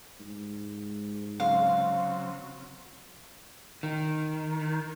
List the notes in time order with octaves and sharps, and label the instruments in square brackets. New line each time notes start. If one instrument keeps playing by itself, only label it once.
[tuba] G#2
[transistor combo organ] C#3 F#3 C4 [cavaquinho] F5
[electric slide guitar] D#3